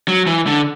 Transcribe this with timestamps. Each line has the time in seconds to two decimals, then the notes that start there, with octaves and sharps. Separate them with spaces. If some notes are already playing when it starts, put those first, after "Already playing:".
0.08 F#3
0.27 E3
0.47 D3